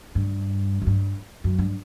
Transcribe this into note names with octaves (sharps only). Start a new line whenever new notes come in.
G2
F#2
G2
F#2
G2